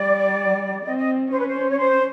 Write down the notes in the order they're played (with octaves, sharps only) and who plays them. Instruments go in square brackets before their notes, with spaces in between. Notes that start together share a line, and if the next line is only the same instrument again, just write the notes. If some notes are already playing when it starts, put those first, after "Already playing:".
Already playing: [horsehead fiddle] G3 [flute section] D5
[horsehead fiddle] C4 [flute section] D#5
[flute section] D#5
[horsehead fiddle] C#4 [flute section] C5
[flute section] B4
C5
C#5
C5